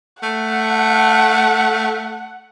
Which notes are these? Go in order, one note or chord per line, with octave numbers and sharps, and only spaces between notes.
A3 F#5